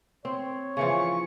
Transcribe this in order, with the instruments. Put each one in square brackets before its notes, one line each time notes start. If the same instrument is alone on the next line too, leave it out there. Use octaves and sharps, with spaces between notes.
[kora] C4 [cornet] C#5
[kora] C#3 E3 F3 [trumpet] C#6